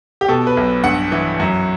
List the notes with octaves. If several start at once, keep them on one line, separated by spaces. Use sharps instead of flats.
G4
B2 A4
B4
B1
G2 F#5
E3
F#2